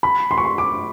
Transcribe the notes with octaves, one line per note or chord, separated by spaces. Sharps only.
B5
C6
C#6
C6
D6